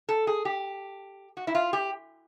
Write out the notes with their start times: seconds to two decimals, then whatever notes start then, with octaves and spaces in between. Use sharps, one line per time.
0.09 A4
0.27 G#4
0.45 G4
1.37 F#4
1.47 E4
1.55 F4
1.73 G4